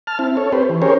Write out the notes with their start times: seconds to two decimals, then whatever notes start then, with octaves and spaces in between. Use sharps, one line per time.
0.07 A5 F6
0.19 C4 E4
0.37 A4 C#5
0.52 C4 G4 B4 C5
0.69 E3
0.82 C#4 G4 G#4 A#4 C5 C#5